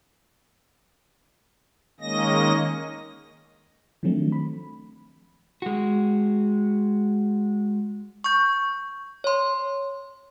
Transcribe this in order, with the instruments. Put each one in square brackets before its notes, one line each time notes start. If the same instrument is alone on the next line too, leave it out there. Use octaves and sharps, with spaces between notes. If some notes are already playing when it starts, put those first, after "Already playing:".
[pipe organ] D#3 G#3 A#3 C#4 D#5 A#6
[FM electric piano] D#3 F3 F#3 A3 C4 D4
B5
[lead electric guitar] G#3 F#4
[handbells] C#6 G6
C#5 C6